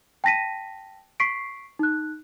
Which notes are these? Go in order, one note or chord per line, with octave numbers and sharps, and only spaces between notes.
G5 A5 A#6 B6 D#7
C#6 B6 C7 D7
D#4 F#6